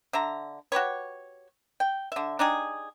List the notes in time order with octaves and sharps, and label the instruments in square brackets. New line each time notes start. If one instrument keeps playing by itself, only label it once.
[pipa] D3 E5 A#5
F#4 G4 B4 C#5
G5
D3 E5
D4 D#4 G4 G#4